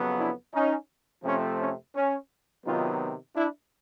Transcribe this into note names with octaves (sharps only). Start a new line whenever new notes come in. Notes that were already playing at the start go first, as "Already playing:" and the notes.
Already playing: F2 C#3 F#3 B3
D4 E4
C#4 D#4
F2 C3 F3 A3 C4 C#4
C#4
C#4
C3 D#3 F#3 B3 D#4 F4
D4 E4